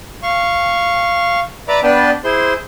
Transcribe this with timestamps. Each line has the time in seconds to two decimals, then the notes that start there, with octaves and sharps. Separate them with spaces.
0.23 F5 C#6
1.68 B4 D5 E5 A#5 B5 D6
1.83 B3 D4 B4 D5 G5 A5
2.24 E4 G#4 C5 C6